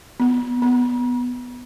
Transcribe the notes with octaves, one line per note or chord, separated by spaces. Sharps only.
B3
B3